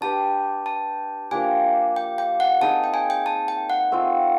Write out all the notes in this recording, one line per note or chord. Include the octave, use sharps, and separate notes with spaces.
D4 G4 B4 A5
A5
F3 A#3 D4 G4 G#5
G5
G5
F#5
C4 D#4 G#4 A5
G5
G#5
G5
A5
G5
F#5
A3 C4 F4